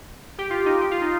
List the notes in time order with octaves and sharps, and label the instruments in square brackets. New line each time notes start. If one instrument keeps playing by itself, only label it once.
[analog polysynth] G4
F4
D#4
G4
F4
D#4